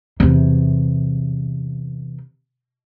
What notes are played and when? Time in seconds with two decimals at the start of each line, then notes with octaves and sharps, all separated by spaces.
0.20 E2 C3